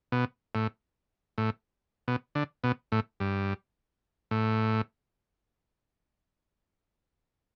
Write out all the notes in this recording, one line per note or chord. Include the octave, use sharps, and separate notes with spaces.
B2
A2
A2
B2
D3
B2
A2
G2
A2